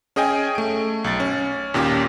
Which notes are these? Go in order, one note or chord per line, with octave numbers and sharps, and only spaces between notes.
C#4 G#4 D#5 G5 G#5
A3 D7
B1 A6
C#4
D#2 A#2 C#4 G4